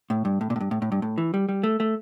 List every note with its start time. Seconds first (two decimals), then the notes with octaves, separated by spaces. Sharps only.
0.10 A2
0.25 G2
0.41 A2
0.50 A#2
0.56 A2
0.60 G2
0.71 A2
0.82 A2
0.92 G2
1.02 A2
1.18 E3
1.34 G3
1.49 G3
1.63 A3
1.80 A3